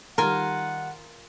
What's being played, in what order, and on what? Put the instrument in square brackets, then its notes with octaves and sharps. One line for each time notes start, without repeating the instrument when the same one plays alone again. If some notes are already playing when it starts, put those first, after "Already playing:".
[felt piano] D#3 G3 [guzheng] F4 G#5 [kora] A#4 [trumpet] F#5